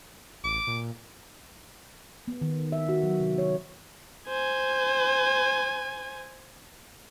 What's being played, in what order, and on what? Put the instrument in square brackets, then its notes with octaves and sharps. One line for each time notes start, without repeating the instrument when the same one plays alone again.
[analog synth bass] A1 [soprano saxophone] D6
[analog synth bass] A#2
[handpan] B3
D#3
E5
F#4
F#3
C3
C#5
[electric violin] C5 G#5